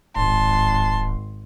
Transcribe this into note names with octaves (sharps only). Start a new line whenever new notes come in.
D1 G#1 A5 C6